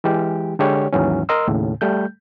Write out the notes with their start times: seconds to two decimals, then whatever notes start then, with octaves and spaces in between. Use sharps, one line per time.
0.04 E3 G#3 G4
0.59 D3 G#3 G4 C#5
0.93 D#2 G#2 E3 F#3 C#4
1.29 A#4 D#5 C6 E6
1.47 D#2 A2 C#3
1.81 G3 A3 G6